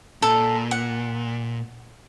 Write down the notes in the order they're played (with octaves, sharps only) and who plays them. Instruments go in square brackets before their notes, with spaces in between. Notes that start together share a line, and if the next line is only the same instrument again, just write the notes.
[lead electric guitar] A#2 [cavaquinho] A4
[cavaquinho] F#5